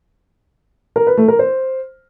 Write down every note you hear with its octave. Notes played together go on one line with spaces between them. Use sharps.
A#4
B4
A3
A#4
C5